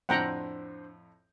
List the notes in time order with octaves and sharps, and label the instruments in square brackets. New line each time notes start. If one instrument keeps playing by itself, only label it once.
[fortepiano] F2 A2 [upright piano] D4 C5 [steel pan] F#5 G5 A#5